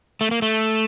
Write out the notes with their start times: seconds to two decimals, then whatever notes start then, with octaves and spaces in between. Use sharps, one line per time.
0.21 A3
0.31 A#3
0.42 A3